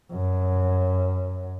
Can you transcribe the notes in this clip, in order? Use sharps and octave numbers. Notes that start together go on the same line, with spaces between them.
F#2